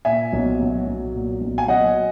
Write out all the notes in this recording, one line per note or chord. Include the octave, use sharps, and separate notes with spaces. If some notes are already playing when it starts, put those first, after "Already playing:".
A#2 E5 G#5
B1
F#3
B1
A#2
B1
G#5
F#3 D#5 F#5